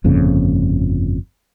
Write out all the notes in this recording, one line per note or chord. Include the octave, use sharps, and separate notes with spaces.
G1 F2 A#2 C#3